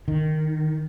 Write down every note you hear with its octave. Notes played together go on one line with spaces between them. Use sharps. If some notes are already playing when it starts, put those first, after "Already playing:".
D#3